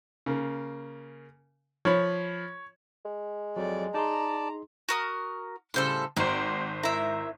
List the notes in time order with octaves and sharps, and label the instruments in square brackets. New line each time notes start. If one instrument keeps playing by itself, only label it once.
[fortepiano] C#3 A#3
[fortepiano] F3 B5 [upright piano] C#5
[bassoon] G#3
[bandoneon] F2 [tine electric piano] F#3 [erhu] D5
[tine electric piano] D#4 G#4 C6 [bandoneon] D5 A5 [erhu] A#5
[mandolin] F#4 A#4 D#6
[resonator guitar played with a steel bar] A2 C#3 G3 [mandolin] A4 C5 C6
[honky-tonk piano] G#1 C5 [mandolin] A#3 D5 [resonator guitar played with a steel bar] C4 F#4
[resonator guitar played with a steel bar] E4 A#4 [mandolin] E5 A#5